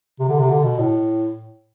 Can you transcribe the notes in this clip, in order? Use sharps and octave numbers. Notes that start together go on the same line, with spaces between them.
C3
D3
C3
D3
B2
A2